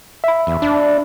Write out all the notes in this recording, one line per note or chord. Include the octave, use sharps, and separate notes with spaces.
E5 B5
E2
D4